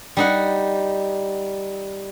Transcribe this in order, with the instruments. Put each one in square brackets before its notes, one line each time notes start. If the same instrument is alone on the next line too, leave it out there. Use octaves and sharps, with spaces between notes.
[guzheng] G3 D#4 F#5